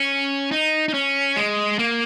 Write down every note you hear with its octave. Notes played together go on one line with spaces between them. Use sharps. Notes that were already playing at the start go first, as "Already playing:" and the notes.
Already playing: C#4
D#4
D#4
C#4
G#3
A#3